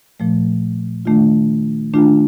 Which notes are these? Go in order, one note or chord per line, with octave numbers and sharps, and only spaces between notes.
A#2 F3 A3
D#3 A3 D4 F4
D#3 A3 D4 F4